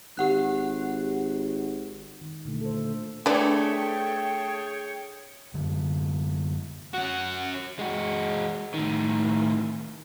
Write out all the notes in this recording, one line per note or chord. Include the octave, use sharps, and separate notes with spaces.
G#1 G4 F#5 F#6
D#3
A#2 D3 A3
A4 C5
E3 A3 D4 G#4 C#5 D5 G5
F#2 D3
C#4 F#4 F#5
G#3 F#4
A2 D#3